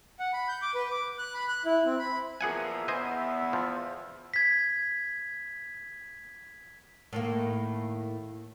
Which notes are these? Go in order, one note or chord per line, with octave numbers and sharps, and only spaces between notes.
F#5
B5
G6
D6
B4
D6
F#6
B5
F#6
E4
C4
B5
E2 F3 A#3 G#4 E5 F#5 G#5
E2 B3 C5 D#5 G#5
F3
G#6 B6
A2 D#3 A#3